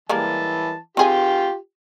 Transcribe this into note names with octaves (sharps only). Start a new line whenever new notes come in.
E3 G3 G#3 A#3 A5
C4 F4 G4 G#4 G#5